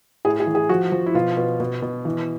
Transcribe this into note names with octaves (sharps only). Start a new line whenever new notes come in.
A2 G#4
G#4
E3
G#4
F3 F#4
F3
E4
B2 F4
B2
B2
B2
E3